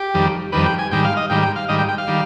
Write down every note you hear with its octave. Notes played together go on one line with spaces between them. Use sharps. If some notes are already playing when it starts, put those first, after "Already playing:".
Already playing: G4
F2 D#3 G3
F2 D#3 G3 B4
G5
G#5
G#2 D#3 G3 G5
F5
D#5
G#2 D#3 G3 G5
G5
F5
G#2 D#3 G3 D#5
G5
G5
F5
D#3 G3